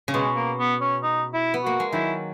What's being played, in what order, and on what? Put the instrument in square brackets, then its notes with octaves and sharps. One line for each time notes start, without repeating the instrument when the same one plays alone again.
[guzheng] C#3
[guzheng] B2 [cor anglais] G#3
[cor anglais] A#3
B3
C#4
D#4
E4
[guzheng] B3
[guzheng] A#3 [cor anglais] F#4
[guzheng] G#3
[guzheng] D#3 F#3 [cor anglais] E4